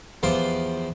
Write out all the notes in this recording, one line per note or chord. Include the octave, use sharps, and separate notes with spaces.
E2 F3 G4 C6 D6